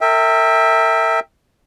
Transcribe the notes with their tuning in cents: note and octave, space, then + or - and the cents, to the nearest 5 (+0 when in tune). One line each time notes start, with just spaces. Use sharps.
A#4 -40 E5 -15 G5 +20